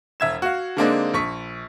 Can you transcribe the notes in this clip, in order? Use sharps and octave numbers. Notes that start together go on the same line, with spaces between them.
E1 E5 G#6 E7
F#4 F5
D3 G#3 A#3 C4 D4 D#4
A#1 C#6 B6